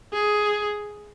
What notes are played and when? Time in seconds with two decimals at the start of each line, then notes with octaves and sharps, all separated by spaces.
0.13 G#4